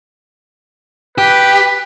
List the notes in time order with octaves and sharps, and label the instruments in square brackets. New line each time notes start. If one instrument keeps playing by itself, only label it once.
[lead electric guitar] G4 [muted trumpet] B4